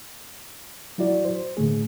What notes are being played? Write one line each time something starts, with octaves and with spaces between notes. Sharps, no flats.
F#3 E4 F#4 D5
C5
A2 D3 A3 G#4